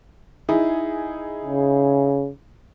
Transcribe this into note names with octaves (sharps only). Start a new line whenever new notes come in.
D#4 E4 G#4
C#3